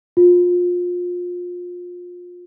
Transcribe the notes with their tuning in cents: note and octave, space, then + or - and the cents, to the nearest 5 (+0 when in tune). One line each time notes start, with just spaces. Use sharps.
F4 +25